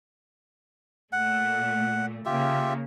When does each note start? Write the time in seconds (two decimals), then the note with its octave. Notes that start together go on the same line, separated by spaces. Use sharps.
1.13 A#2 A3 F#5
2.25 C#3 A#3 F4 G4 E5